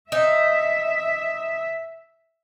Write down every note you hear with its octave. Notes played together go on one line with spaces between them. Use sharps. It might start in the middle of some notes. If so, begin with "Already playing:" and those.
D#4 E5